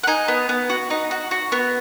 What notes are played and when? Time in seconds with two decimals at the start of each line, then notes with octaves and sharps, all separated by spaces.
0.03 F#5
0.07 D#4 G#5
0.28 B3
0.49 B3
0.70 F#4
0.90 D#4
1.11 F#4
1.31 F#4
1.52 B3